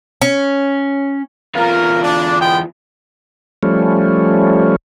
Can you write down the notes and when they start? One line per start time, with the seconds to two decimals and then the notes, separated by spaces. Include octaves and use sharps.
0.22 C#4
1.55 E2 F4 A#4
2.03 D4
2.41 G#3 B3 G5
3.63 F3 G3 A3 C#4